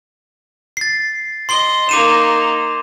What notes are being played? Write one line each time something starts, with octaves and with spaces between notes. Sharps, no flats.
A6 C7
D#5 C6 C7 G7
A#3 D#4 D6 D#7 E7